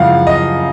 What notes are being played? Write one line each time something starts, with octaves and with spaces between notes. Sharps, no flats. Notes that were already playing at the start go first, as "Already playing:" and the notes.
Already playing: F#2 C#3 F3 F5 F#5
D#5